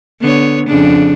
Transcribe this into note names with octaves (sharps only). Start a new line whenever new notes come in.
D3 B3 C#5
F2 C#3 D4